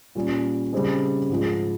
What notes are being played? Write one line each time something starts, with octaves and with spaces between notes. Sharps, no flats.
A#2 G3 C#4
C#3 G3 C4 D#4 G#4
G#2 F3 G#3